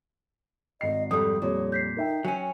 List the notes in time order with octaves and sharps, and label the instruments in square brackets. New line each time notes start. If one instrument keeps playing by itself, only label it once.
[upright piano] G#1 C7 [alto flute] D#5
[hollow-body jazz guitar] F2 G3 [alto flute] A4 [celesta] D#6
[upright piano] F2 G3 [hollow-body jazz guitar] A#2 [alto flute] C#5
[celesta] G6 B6 C7
[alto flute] D#4 [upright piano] A#4 E5 G5
[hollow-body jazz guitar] F#3 C#4 [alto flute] G#5